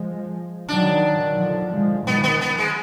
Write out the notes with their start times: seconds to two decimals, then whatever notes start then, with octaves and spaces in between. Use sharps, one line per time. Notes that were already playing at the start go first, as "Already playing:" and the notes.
Already playing: F3 G#3
0.68 D#3 F#3 D4
1.37 D3 F3
1.72 F3 G#3
2.06 D#3 F#3 B3
2.24 B3
2.41 B3
2.58 G#3